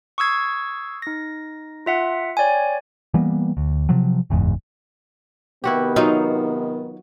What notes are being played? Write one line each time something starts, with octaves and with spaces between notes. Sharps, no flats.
C#6 D#6 E6 G#6 C7
D#4 A#6
F4 E5 F#5
C#5 D5 G5 G#5
E3 G3 A#3 B3
D2
C3 F3 F#3
F#1 E2 G#2
C3 D#3 B3 E4 F#4 G4
F#3 D#4 F4